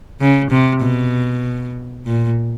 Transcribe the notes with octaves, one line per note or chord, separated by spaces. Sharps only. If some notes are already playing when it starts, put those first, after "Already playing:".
C#3
C3
B2
A#2